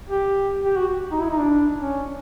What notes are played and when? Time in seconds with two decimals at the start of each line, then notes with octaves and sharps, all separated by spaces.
0.09 G4
0.65 G4
0.77 F#4
1.11 D#4
1.20 E4
1.30 D#4
1.39 D4
1.77 C#4